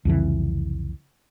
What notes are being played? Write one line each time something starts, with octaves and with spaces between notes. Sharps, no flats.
C2 F2 C#3 E3